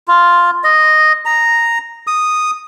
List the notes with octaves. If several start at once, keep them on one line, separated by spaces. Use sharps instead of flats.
F4
D#5
A#5
D#6